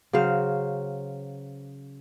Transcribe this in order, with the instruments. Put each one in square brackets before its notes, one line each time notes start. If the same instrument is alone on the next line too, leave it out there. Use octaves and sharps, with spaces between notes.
[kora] C#3 F#3 C5 F5